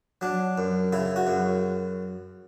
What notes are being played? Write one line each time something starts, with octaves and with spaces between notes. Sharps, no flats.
F#3 D4
F#2
C#3 E4
F#4
F#2